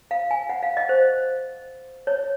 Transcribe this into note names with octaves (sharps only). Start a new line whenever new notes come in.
F5
G#5
F#5
F5
D#5
C5
C#5